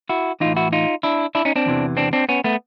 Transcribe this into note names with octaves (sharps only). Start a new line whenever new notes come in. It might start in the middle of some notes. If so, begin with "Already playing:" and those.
E4 F#4
A2 E3 D#4 F4
E4 F#4
D#4 F4
D4 E4
D4 E4
C#4 D#4
C4 D4
E2 C3 E3
C4 D4
C4 D4
B3 C#4
A3 B3